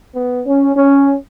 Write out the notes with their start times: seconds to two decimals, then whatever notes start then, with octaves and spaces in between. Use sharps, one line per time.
0.15 B3
0.46 C#4
0.75 C#4